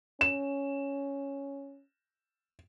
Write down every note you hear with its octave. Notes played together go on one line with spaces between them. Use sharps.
C#4 E7